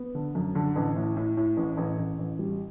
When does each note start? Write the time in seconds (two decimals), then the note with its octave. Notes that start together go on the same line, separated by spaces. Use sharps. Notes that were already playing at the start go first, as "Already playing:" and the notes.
Already playing: B3
0.15 D3
0.35 F#2
0.55 D3
0.76 A1
0.96 A2
1.16 A2
1.37 A2
1.57 A1
1.77 A1
1.98 A1
2.19 A1
2.39 G3